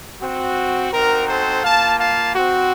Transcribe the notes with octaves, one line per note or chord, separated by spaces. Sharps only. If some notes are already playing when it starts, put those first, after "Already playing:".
C4 F#4
C4 D#4 F#4 A#4
A4 C5
A#3 F4 F5 A5
F5 A5
C4 F#4